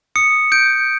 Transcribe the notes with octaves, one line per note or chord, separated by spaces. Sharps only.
D#6 C#7
G6 D7